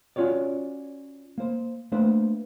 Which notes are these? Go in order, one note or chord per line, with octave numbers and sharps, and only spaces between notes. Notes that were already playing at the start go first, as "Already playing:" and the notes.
C#4 F4 F#4 C#5 D5
A#3 C5
A3 A#3 D4 B4 C5